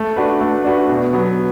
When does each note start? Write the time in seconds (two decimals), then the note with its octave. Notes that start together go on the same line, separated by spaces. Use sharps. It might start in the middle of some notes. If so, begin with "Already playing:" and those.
Already playing: A3
0.16 D4 F#4 B4
0.41 A3
0.65 D4 F#4 B4
0.89 B2
1.13 F#3 B3